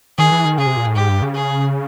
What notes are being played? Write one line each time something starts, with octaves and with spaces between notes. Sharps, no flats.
D#3 G#4
E3
D#3
C#3 G#4
C3
A#2
A2
G#2 G4
G2
C#3
G#4